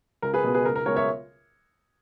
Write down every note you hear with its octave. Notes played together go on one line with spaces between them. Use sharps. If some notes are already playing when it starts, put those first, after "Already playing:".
C#2 A#4
G#4 B4
B2 G#3 B3 G#4
G#4 B4
C#2 A#4
A#4
C#3 G#3 B3 A#4 C#5
C#5 E5